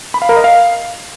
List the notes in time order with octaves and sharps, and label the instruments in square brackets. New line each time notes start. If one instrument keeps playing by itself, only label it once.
[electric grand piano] B5
F5
A#4
D#5
F5